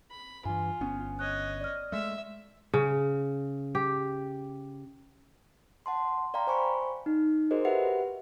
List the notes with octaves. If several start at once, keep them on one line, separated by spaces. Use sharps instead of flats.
B5
G2 E3 F4 G#5
G1 B3 C#4
C#5 D#5 F#6
D5 F6
G#3 A3 E5
C#3
G4
F#5 A5 C6
D5 F5 G5 A#5 C6
C5 G#5 B5 C#6
D#4
F#4 G#4 A#4 C5 D#5
F#4 G4 B4 E5 F#5